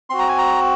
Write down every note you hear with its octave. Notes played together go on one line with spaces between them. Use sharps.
C4 F#4 C6
A#5
G#5
A#5